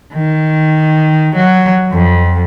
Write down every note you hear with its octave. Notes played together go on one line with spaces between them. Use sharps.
D#3
F#3
F2